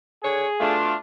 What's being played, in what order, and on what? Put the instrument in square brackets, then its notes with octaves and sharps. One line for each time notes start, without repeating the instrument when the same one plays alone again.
[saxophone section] D3 C#5 [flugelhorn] G#4
[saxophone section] B2 A3 [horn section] D4 F4